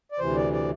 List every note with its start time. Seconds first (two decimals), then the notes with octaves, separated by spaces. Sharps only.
0.12 D5
0.19 D2 C3 E3 C5
0.36 D5
0.53 D5